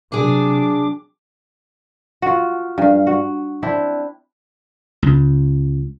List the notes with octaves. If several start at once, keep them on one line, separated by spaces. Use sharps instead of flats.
C3 F#3 D4 G#4 D6
F4 F#4
G2 F5
F#4
C4 D4 E4
C#2